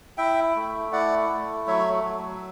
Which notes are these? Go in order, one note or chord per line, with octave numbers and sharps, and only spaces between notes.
E4 E5 G5
A3
E4 D5 F#5
A3
F#3 C#5 E5
F#3